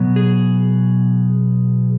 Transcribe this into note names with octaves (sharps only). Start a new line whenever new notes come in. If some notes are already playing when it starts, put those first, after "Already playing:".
Already playing: B2 F#3 B3
G#4